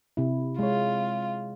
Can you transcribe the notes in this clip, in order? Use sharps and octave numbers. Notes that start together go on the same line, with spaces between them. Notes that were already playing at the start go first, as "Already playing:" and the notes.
C3 E4
G#3 F4 C#5